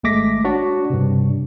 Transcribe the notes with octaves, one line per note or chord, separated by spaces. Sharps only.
G#1 G#3 A3 D6 A#6 B6
D4 F#4 C#5 D5
G2 C3